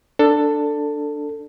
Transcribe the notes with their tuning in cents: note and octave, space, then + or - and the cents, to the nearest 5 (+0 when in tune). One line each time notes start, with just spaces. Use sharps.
D4 +0 A4 +15